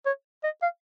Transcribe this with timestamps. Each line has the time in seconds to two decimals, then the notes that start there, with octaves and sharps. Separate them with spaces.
0.06 C#5
0.43 D#5
0.62 F5